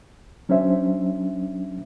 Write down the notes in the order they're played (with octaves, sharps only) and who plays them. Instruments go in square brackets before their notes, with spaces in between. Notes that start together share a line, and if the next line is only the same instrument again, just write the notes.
[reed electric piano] F#3 C#4 D4 C5 E5